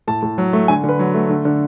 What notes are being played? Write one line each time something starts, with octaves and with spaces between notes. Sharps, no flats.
A2 A5
A2
F#3
A3
D3 G#5
D3
B4
F#3
A3
D3
D3